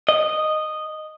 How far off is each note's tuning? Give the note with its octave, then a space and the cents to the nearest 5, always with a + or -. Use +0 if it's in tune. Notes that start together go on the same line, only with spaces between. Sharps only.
D#5 -10